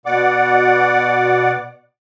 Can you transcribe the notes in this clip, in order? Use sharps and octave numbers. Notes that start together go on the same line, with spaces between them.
B2 D5 F#5 D6